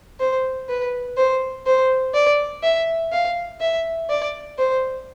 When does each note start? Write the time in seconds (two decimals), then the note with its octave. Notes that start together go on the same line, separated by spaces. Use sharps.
0.20 C5
0.69 B4
1.17 C5
1.66 C5
2.14 D5
2.63 E5
3.12 F5
3.61 E5
4.10 D5
4.58 C5